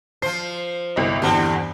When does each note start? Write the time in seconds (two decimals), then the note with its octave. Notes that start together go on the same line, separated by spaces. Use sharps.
0.22 F3 C5 C7
0.96 G1 C2 D#5
1.22 E2 G2 D3 G3 C4